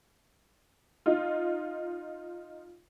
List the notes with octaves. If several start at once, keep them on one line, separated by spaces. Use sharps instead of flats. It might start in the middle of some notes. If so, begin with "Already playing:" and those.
D#4 F4